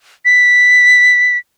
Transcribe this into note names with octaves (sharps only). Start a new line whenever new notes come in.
B6